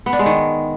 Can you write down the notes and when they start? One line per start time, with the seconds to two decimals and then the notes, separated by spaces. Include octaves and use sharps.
0.06 B3
0.13 D4
0.19 G#3
0.26 D#3